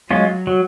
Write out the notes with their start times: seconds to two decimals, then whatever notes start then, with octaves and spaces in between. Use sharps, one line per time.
0.10 F#3 G#3 C#4 F4
0.47 F#3